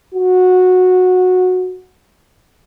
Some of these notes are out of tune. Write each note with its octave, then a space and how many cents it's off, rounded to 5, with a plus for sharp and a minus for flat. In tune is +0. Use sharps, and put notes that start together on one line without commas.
F#4 -15